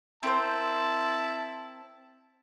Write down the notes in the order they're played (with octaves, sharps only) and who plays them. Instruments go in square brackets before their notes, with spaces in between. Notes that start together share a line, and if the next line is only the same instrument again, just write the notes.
[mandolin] C4 A#4 C5 [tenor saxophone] E4 [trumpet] A5